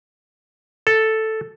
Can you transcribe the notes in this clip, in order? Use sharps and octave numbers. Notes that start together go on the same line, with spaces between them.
A4